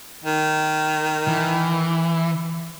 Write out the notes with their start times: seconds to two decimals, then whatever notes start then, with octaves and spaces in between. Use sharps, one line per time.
0.24 D#3
1.28 E3